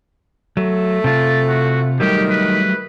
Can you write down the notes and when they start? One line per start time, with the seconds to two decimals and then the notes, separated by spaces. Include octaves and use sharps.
0.57 F#3 A3
1.04 C3 F4 A5
1.48 F#4
2.00 D#3 F#3 G3 A3 G4
2.30 B4